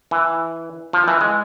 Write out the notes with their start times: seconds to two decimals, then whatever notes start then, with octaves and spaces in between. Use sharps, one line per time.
0.11 E3
0.93 F3
1.08 E3
1.21 G#3